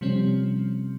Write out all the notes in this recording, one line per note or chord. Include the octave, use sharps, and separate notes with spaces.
C3 F3 G3 C4 C#4